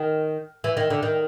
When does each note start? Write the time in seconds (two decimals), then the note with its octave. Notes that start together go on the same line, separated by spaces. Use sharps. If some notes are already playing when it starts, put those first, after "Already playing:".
Already playing: D#3
0.64 E3
0.77 D#3
0.90 D3
1.03 D#3